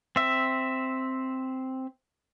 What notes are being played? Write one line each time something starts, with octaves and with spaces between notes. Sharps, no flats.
C4 E5